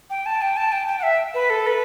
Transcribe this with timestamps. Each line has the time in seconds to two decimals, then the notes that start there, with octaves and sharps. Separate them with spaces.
0.10 G5
0.26 A5
0.42 G5
0.57 A5
0.72 G5
0.88 G5
0.99 F#5
1.03 E5
1.34 B4
1.50 A4
1.67 B4